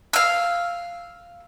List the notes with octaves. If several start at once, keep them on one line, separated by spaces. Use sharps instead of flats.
F5 E6